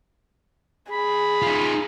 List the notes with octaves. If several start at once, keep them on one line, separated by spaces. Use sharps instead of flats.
G#4 B5
D#4 F4